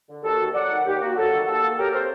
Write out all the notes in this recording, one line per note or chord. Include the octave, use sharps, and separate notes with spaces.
D3
D#2 F#4 A4
D#2
F#3 D5 F#5
D#3
D#2 G4
A#3 F#4
F#3 F#4 A4
D#3
D#2 F#4 A4
A#3
F#3 G4 A#4
C3 A4 C5